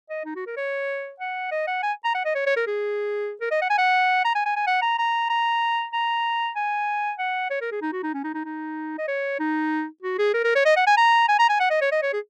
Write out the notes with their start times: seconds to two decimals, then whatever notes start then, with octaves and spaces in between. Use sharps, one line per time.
0.10 D#5
0.25 D#4
0.36 F#4
0.47 A#4
0.57 C#5
1.20 F#5
1.51 D#5
1.67 F#5
1.83 G#5
2.04 A#5
2.15 F#5
2.25 D#5
2.35 C#5
2.46 C#5
2.56 A#4
2.67 G#4
3.41 A#4
3.51 D#5
3.62 F#5
3.70 G#5
3.78 F#5
4.25 A#5
4.35 G#5
4.46 G#5
4.56 G#5
4.67 F#5
4.82 A#5
4.99 A#5
5.30 A#5
5.93 A#5
6.56 G#5
7.19 F#5
7.50 C#5
7.61 A#4
7.72 G#4
7.82 D#4
7.92 F#4
8.03 D#4
8.14 C#4
8.24 D#4
8.34 D#4
8.45 D#4
8.98 D#5
9.08 C#5
9.40 D#4
10.02 F#4
10.19 G#4
10.34 A#4
10.44 A#4
10.55 C#5
10.66 D#5
10.76 F#5
10.87 G#5
10.97 A#5
11.28 G#5
11.39 A#5
11.49 G#5
11.60 F#5
11.70 D#5
11.81 C#5
11.92 D#5
12.02 C#5
12.13 G#4